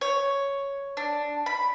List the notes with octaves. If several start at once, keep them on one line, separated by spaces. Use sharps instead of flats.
C#5
D4
B5